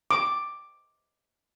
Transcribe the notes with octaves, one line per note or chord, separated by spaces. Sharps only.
D6